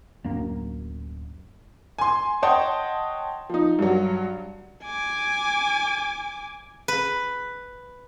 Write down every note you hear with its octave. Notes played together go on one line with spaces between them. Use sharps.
D1 F#2 A#3 D4
G#5 C6
C#5 D#5 F#5 G5 A5 C6
F3 D#4
G2 F#3
G#5 D6
B4